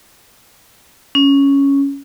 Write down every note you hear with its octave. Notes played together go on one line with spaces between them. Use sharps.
C#4